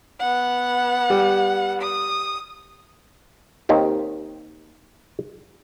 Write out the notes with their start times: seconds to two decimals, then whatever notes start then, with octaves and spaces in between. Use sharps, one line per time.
0.20 B3 F#5
1.10 G3
1.82 D#6
3.69 D#2 D#3 C4 G4